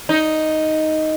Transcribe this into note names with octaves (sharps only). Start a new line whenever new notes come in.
D#4